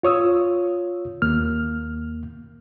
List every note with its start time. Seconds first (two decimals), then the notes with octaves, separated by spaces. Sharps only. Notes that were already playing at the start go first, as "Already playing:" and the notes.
0.03 F4 C#5 D#6 E6
1.22 D#2 A#3 F6